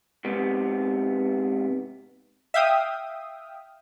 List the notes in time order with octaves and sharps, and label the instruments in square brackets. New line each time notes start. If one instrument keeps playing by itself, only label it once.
[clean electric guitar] G#2 C3 B3
[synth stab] E5 F5 G5 D#6